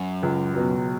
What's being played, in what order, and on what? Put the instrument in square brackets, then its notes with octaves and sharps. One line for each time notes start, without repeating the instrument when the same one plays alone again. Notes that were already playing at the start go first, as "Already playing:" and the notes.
Already playing: [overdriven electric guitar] F#2
[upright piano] C#2
B2 F#3